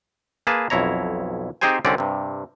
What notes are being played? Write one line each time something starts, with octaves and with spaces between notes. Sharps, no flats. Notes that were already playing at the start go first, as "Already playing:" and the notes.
A#3 G#4 B4 A5
B1 F2 E4 C#5 A#5
C4 D#4 G4 G#4 C5 G#5
C2 D3 C4 C#4 D5
G2 C3